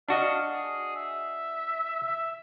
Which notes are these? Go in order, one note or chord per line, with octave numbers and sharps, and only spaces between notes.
D4 F#4 D#5 F5
G#4
E5
E5